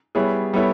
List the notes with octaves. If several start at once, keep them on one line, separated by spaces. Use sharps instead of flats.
G3 B3 E4 G#4 C#5
G3 B3 E4 A4 C#5